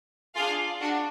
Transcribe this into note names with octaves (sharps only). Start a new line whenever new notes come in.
D4 F4 G#4 F5
D4 F#4